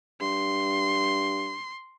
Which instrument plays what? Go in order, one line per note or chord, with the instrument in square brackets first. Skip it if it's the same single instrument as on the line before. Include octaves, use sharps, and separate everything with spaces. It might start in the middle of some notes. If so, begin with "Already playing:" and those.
[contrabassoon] G2 [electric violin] C6